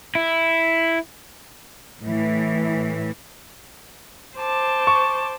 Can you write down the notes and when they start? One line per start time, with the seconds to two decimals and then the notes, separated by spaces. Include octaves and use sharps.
0.15 E4
1.99 A2 E3
4.37 C5 A5 D6
4.87 C#6